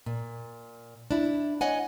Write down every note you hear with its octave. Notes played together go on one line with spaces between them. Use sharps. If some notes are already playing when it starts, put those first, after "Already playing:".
A#2
D4 E4
C#5 D#5 F#5 G#5